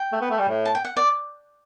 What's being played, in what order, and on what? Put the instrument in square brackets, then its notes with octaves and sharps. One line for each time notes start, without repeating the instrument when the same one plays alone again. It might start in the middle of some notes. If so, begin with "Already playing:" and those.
Already playing: [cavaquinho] G5
[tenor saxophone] A3
B3
A3
G3
A2
[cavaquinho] A5
G5
F#5
D5